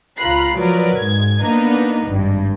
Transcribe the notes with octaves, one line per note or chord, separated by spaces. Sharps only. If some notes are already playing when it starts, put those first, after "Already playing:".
C#2 F4 A#5 B5 F#6 C7
F3 F#3 A#4 B4 D5
G#2 G#6
A#3 B3 D4 D#4 B4
G#1 G2